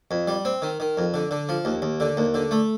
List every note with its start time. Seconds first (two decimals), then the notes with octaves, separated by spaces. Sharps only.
0.11 F2
0.28 G3
0.45 C4
0.62 D#3
0.80 D#3
0.97 F2
1.14 D3
1.31 D3
1.49 F3
1.65 D#2
1.82 D#2
2.00 D3
2.17 D#2
2.34 D3
2.51 A3